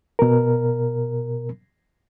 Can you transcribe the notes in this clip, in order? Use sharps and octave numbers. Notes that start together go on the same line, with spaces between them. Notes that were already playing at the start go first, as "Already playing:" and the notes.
B2 A#4